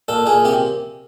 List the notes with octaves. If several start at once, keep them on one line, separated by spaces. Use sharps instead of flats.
A#2 A4
A#2 G#4
C3 G4